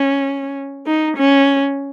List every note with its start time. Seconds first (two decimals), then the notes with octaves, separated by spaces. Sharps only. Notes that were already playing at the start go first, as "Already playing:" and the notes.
Already playing: C#4
0.87 D#4
1.17 C#4